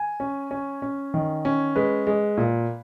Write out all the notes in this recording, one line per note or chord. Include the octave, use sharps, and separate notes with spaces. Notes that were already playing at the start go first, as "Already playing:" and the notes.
Already playing: G#5
C#4
C#4
C#4
D#3
C#4
G#3 B4
G#3
A#2